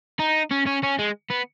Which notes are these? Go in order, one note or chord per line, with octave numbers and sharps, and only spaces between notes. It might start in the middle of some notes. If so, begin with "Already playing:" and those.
D#4
C#4
C#4
C#4
G#3
B3